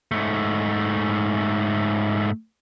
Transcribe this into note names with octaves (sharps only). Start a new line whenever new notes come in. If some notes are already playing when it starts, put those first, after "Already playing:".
G#2 A3